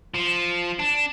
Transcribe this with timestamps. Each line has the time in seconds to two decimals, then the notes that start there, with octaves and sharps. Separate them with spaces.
0.14 F3
0.79 D4